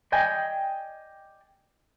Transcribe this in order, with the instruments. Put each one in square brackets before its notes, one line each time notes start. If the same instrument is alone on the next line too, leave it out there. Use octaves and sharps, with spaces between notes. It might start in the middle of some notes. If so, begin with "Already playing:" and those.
[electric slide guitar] D5 D#5 G5 G#5